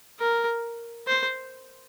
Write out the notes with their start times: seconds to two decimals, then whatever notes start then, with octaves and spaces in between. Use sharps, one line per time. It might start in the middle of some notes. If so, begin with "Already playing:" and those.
0.19 A#4
1.07 C5